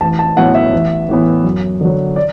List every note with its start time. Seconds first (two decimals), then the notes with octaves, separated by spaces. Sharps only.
0.01 A1 A5
0.19 A5
0.37 A2 F#3 B3 F#5
0.55 E5
0.73 A1
1.09 A2 E3 B3
1.44 F#2
1.81 D3 F#3
2.16 D5